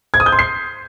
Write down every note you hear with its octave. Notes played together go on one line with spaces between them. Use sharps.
G#6
D#6
G6
C6
C7